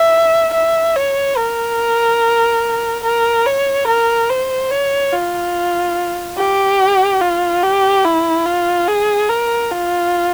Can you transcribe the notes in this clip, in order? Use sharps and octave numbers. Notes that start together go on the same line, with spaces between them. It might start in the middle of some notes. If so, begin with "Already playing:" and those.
Already playing: E5
E5
C#5
A#4
A#4
C#5
A#4
C5
C#5
F4
G4
F4
G4
E4
F4
G#4
A#4
F4